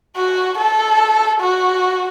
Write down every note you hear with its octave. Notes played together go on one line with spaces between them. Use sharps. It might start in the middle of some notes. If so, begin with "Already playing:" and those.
F#4
A4
F#4